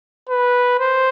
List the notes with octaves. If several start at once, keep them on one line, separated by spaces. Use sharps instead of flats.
B4
C5